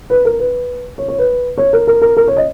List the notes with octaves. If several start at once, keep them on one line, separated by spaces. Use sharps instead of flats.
B4
A#4
B4
C#5
C#5
B4
C#5
A#4
A#4
A#4
A#4
C#5
D#5